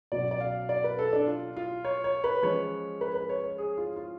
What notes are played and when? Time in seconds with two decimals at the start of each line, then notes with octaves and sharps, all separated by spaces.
0.12 B2 F#3 C#4 D5
0.31 D5
0.40 F5
0.69 D5
0.84 B4
0.99 A4
1.13 D4
1.27 F4
1.57 F4
1.85 C#5
2.04 C#5
2.24 B4
2.42 F3 G#3 C#4 C#5
3.01 B4
3.15 B4
3.29 C#5
3.44 C#5
3.58 G#4
3.77 F4
3.96 F4